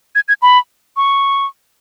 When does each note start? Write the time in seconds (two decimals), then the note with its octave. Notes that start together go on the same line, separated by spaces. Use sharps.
0.15 G#6
0.28 G#6
0.42 B5
0.97 C#6